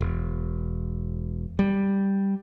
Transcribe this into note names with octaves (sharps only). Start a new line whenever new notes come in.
E1
G3